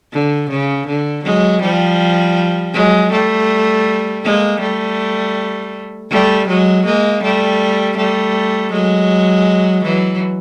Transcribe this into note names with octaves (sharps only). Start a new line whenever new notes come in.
D3
C#3
D3
F#3 G#3
F3 G3
F#3 G#3
G3 A3
G#3 A#3
G3 A3
G3 A3
F#3 G#3
G#3 A#3
G3 A3
G3 A3
F#3 G#3
E3 F#3